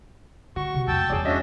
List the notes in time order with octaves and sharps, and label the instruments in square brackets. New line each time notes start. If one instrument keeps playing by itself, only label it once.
[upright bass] D3 [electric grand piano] F#4 [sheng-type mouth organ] C#6
[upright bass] C3
[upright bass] F2 A#3 [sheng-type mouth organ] G5 A5 E6
[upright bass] E2 G2 [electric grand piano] G#4 C#5 D5
[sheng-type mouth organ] C#4 D4 F#4 [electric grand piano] D#5 E5